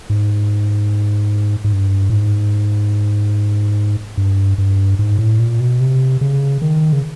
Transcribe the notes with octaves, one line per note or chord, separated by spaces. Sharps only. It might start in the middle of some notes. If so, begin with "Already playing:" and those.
G#2
G#2
G2
A2
G#2
G2
G2
G#2
A2
A#2
B2
C3
C#3
D#3
C#3